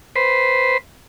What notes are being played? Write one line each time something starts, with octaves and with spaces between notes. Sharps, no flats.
B4 C5